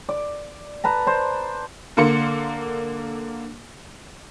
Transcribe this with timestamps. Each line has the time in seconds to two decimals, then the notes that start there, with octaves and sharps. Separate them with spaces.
0.09 D5
0.84 B4 A5 A#5
1.07 C5 D5
1.97 D3 A#3 C6 C#7